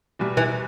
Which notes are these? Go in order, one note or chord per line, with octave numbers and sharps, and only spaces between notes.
E2 B2 G3
E3